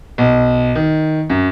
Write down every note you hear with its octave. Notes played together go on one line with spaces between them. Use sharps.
B1
D#3
F#2